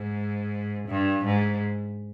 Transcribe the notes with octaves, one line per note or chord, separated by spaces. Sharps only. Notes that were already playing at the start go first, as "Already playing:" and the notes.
Already playing: G#2
G2
G#2